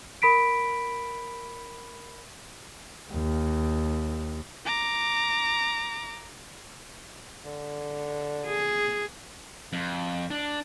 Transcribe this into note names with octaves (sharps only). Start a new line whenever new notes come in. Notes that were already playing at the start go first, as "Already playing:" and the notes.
A#4 B5 B6 D7
D#2
A#5 D6
D3
G#4
F2
D4